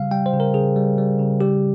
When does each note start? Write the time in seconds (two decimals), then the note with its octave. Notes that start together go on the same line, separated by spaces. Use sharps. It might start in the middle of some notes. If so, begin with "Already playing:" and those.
Already playing: C#3 G3 F5
0.11 G3 G5
0.26 C5
0.33 C#3
0.40 A#4
0.54 C#3 G#4
0.76 G3
0.98 G3
1.19 C#3
1.41 G3 G4